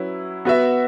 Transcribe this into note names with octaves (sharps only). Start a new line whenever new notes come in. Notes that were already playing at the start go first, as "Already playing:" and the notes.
Already playing: F#3 C#4 E4 B4
B3 F#4 B4 E5